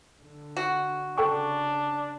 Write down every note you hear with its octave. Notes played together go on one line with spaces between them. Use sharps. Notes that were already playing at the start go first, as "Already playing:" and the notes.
D3
F#4
C#3 D4 A4 G5 C#6